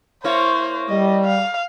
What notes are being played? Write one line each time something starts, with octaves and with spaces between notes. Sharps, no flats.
A#3 E4 C5 C#5
G3 D#5
F5